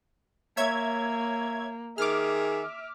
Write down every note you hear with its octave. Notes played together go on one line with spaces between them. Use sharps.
A#3 C#5 E5 G#6
D#3 G#4 E5 D6 F6